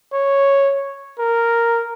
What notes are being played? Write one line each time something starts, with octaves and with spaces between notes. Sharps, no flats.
C#5
A#4